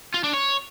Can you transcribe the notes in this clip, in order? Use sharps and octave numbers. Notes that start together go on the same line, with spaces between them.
F4
D4
C#5